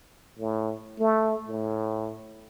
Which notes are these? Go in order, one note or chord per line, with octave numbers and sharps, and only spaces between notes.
A2
A3
A2